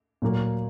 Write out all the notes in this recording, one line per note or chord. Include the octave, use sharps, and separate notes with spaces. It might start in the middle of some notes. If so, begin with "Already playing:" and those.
A#2 F#3 A#3